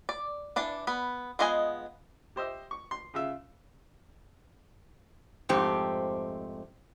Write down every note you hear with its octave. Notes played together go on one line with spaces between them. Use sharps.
D5
E3 D4 A5
B3 B5
G#3 B3 F4 D#5 G#5
G4 C5 D#5 E5
C#6
C6
C#3 F4 E5
F2 G#2 A3 C4 G4